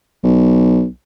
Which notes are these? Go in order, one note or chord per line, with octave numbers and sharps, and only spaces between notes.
B1